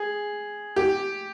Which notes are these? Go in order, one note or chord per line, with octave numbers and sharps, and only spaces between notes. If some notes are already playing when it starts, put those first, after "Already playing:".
Already playing: G#4
G4